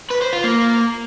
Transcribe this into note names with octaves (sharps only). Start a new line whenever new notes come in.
B4
C5
F4
A#3